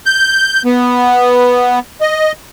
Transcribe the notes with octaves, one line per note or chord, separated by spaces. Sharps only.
G6
B3
D#5